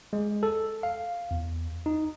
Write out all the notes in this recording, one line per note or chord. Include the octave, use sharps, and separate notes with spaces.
G#3
A4
F5
E2
D#4